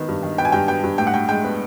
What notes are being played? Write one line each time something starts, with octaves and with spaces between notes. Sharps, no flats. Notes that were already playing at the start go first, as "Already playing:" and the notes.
Already playing: D#3 B3
G2
D#3
B3 G5
G#5
G2 G5
B3 G5
G2
A2 G5
F#5
A2 G5
G#3 G5
B3